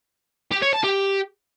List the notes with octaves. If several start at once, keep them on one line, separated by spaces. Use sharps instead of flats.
G4
C#5
A5
G4